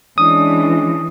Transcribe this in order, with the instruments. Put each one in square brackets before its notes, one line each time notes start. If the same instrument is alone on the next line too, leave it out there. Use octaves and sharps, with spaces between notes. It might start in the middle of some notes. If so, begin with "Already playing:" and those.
[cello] E3 [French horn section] G#3 C#4 D4 [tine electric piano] D#6